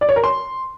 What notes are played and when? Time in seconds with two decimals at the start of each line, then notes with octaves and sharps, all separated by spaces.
0.01 D5
0.09 C#5
0.16 A#4
0.24 C6